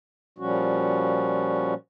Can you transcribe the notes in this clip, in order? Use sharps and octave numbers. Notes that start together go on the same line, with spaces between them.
A#2 F3 G3 C#4 F#4